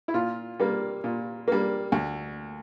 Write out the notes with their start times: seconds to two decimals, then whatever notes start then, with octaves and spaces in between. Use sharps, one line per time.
0.08 E4
0.14 A#2 F4
0.60 G3 A#3
1.04 A#2
1.48 G3 A#3
1.92 D2